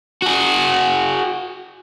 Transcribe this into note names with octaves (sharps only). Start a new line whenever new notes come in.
F#4 G#4